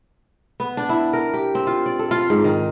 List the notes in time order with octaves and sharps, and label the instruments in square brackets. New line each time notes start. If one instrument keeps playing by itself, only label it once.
[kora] B3
D4
E4
A#4
G4
C4
F4
D5
A4
F4
G#2
D#3